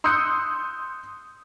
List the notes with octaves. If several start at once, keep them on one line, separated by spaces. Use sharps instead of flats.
C6 D#6 E6 F#6 G6 C#7